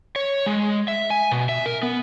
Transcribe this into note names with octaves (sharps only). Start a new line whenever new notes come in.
C#5
G#3
E5
G#5
B2
E5
A#4
B3